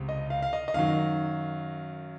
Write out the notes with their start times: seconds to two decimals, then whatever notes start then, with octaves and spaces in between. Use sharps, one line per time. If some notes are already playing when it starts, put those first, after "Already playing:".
Already playing: C#2 C3
0.09 D#5
0.30 F5
0.42 F5
0.53 D#5
0.68 D#5
0.74 F#2 D#3 F#3 F5